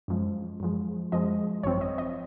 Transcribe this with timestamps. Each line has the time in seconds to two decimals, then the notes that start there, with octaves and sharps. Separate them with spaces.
0.08 F#2 F3 G#3
0.60 F#2 F3 G#3
1.12 F#2 F3 G#3 D#5
1.63 G#1 F#2 F3 C4 C#5
1.81 D#5
1.98 D#5